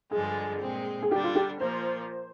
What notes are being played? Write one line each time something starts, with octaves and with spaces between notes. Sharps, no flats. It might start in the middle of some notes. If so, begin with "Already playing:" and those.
G2 D3 F3 G#3 G#4
A#2 G#3 C4
G#4
D3 G3 D4 G4
F4
G4
A#2 F3 A#3 C5